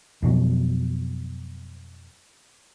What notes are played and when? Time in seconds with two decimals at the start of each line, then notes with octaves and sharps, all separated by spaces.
0.22 F2 B2 F#3